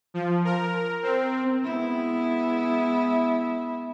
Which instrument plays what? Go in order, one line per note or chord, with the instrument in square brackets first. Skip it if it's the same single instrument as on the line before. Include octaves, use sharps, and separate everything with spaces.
[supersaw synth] F3
A#4
C4
[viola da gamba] G#3 B3 E4